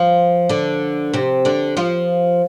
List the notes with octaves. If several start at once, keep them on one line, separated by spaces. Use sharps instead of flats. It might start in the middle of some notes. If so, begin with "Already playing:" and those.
Already playing: F3 F4
D3 D4
C3 C4
D3 D4
F3 F4